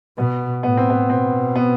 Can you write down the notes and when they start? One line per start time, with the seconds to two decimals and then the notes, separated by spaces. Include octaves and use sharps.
0.18 B2 B3
0.63 A2 B3
0.77 C4
0.90 B3
1.10 B2 C4
1.56 B3